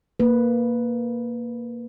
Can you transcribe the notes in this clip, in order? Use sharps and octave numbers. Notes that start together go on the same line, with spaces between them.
A#3 B4